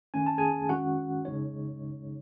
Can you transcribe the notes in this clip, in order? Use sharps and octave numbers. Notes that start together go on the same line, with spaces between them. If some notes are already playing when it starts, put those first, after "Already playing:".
D#3 A3 C#4 G#5
A5
G#4 G#5
D#3 G#3 C#4 F#4 F#5
C#3 G#3 D#4 C#5